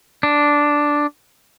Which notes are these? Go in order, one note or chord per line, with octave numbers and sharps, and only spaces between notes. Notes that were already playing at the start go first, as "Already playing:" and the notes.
D4